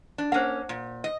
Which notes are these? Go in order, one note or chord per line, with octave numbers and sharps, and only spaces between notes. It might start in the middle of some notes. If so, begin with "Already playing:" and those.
D4
A#3 C#4 C5 F#5
A#2
D#5